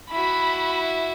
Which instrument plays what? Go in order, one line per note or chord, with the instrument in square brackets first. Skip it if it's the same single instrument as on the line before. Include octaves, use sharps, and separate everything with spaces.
[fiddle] E4 F#4 [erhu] B5